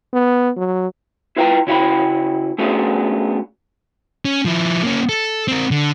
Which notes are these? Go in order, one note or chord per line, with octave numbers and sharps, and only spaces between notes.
B3
F#3
E4 F4 B4 F5 G5 A#5
C#3 E4 F#4 E5 G5 B5
A3 B3 C#4 D4 F#4 G#4
C#4
F3 E4
A#3 C#4
A4
C4 A#4
D3